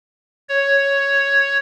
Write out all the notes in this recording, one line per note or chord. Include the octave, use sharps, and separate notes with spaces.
C#5